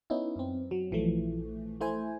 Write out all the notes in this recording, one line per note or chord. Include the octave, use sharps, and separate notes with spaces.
B3 C#4 D#4 E4
F#2 C4
F#3
A#1 E3 F3 A3
A3 E4 C5 G#5